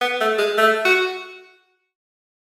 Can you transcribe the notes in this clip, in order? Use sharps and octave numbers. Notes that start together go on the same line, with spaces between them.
B3
A3
G#3
A3
F#4